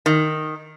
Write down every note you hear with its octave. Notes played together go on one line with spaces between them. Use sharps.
D#3